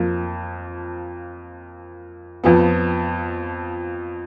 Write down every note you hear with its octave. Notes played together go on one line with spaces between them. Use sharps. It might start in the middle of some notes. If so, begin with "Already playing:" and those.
Already playing: F2 F3 A#3
F2 F3 B3